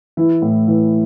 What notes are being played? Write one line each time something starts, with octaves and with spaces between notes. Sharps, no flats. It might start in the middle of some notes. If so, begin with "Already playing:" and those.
E3 E4
A2
E3